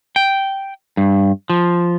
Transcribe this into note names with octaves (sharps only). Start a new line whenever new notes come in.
G5
G2
F3